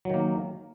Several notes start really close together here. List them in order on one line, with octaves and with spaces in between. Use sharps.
F#3 D#3 A#3